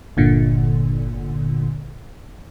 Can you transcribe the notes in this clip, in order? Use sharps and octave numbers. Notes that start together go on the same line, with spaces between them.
G1 A#2 D3